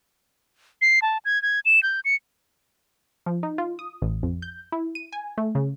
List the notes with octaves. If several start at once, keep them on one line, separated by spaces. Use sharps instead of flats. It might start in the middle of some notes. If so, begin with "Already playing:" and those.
C7
A5
G#6
G#6
E7
G6
C#7
F3
D#4
F4
D#6
A1
F2
G6
E4
D#7
G#5
A3
C#3